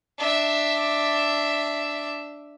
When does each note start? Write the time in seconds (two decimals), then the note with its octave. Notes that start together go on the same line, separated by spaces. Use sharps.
0.18 D4 E5